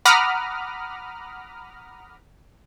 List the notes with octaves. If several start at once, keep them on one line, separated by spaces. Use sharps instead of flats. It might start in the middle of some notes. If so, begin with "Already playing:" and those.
F#5 A#5 B5 D6 D#6 F6